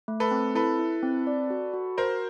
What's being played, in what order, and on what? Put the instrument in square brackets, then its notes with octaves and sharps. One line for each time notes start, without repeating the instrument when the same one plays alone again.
[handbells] A3
[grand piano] A4 B4
[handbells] C4
[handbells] E4 [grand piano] A4 B4
[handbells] E4
C4
D5
F#4
F#4
[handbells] F#4 [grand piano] A#4 C5